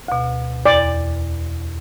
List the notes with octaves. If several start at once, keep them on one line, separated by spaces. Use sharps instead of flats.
D2 B2
E2 D5